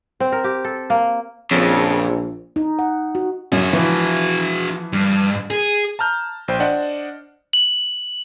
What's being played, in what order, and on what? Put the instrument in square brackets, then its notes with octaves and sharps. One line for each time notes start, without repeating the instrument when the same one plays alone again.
[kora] C4
A#4
G4
A4
A#3
[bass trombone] A#1 [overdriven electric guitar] F2 [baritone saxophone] C#3
[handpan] D#4
F#5
F#4
[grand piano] F#2 [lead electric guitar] E4 F#4
[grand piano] E3 F3
[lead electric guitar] G2
G#4
[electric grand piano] A5 A#5 F6 G6
A#1 C5 G5 G6
D4 C5 D5 D#5 F#5
[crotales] F#7